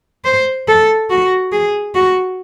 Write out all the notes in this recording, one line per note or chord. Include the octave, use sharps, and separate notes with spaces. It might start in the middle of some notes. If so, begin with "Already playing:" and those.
C5
A4
F#4
G#4
F#4